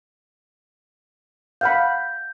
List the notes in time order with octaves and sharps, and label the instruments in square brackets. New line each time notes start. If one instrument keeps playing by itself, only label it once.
[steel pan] F5 F#5 B5 [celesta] G6